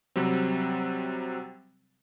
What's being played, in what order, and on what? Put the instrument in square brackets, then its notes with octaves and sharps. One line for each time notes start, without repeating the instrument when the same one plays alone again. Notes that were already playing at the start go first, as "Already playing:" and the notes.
[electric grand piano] C3 F#3 G3 C4